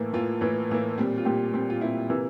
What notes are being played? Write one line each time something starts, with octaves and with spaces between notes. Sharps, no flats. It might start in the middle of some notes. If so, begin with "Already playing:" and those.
Already playing: A2 E3 A#3
A2 E3 A#3 F4
A2 E3 A#3
A2 E3 A#3
A#2 G3 C4
F4
A#2 G3 C4 G4
A#2 G3 C4
F4
A#2 G3 C4 E4
C3 E3 A#3